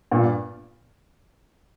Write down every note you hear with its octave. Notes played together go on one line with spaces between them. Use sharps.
G2 A#2